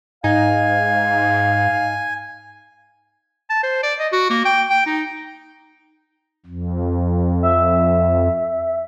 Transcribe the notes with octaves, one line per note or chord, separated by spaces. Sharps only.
G#2 D#4 F5 G#5
A5
C5
D5
D#5
F#4
A#3
G5
G5
D#4
F2
E5